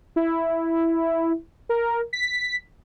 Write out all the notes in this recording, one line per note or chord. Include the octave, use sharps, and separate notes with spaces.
E4
A#4
B6